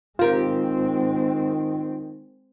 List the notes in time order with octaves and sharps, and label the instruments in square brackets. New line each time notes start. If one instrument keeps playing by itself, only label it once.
[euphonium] D#3 [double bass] G#3 C4 [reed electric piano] F4 [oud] G4 A#4 C5